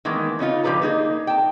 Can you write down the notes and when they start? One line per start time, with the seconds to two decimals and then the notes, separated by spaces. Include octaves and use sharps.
0.05 D#3 E3 G#3 A#3 B3
0.39 C#3 C#4 D#4 F4
0.63 D3 F3 G4 G#4 B4 A#5
0.82 A#3 D#4 G#4
1.27 G5 A5